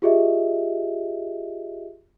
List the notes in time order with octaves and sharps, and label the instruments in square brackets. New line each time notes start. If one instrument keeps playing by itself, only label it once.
[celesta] F4 G4 G#4 D#5 E5